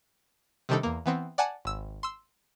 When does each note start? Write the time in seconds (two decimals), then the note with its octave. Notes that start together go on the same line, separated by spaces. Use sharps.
0.69 C3 D#3 G3 D4 D#4 A4
0.83 E2 A#3
1.06 E3 B3 C4
1.38 D5 F#5 G#5 A5 G#6
1.65 G#1 E6
2.03 C6 E6